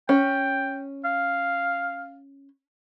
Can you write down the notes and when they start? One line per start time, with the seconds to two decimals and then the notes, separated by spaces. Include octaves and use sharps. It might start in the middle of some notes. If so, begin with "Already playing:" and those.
0.09 C#4 G5
1.05 F5